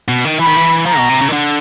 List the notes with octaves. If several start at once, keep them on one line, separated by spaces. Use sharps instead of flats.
B2
D#3
E3 B5
D#3
E3
F3 A#5
B2
C3
C#3
D#3
D3